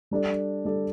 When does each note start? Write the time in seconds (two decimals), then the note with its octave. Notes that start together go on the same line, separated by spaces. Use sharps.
0.11 G3 D4 A4 D5
0.65 G3 D4 A4 D5